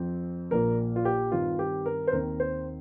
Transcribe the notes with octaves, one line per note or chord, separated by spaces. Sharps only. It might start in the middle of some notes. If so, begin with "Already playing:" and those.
Already playing: F2 F3 C4
A#1 A#2 A#3 A#4
F4
G4
G2 D#3 C4 F4
G4
A#4
C5
D#2 D#3 C4 A#4
C5